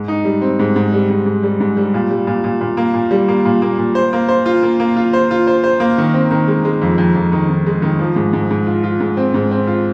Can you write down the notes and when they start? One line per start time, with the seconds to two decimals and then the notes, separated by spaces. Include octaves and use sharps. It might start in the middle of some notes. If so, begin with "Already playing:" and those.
Already playing: G#2
0.08 D#4
0.25 G3
0.42 C4
0.59 G#2
0.76 G#2
0.93 G3
1.10 G#2
1.26 G#2
1.43 G3
1.60 G#2
1.77 G3
1.94 A#2
2.10 G3
2.27 A#2
2.44 A#2
2.61 A#2
2.77 A#3
2.94 A#2
3.11 G3
3.28 A#3
3.45 A#2
3.62 A#3
3.78 A#2
3.95 C5
4.13 A#3
4.29 C5
4.46 F4
4.63 A#3
4.80 A#3
4.96 F4
5.13 C5
5.31 F4
5.47 C5
5.64 C5
5.80 A#3
5.98 D#3
6.14 C4
6.31 D#3
6.48 G#3
6.65 G#3
6.82 F2
6.98 F2
7.16 F2
7.32 D#3
7.49 D#3
7.66 G#3
7.82 D#3
7.99 F3
8.16 G#2
8.33 G#2
8.51 G#2
8.67 F4
8.84 F4
9.00 G#2
9.17 C4
9.34 G#2
9.51 C4
9.67 F4